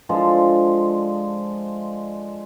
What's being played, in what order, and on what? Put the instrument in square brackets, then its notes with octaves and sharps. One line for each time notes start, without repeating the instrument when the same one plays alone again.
[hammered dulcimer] F3 G#3 D4 A4